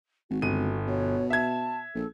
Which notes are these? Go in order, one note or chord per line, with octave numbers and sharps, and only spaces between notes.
G#1 F#4
G1 F#4 D#7
B2 C#5
E5 A5 G#6
A#1 A4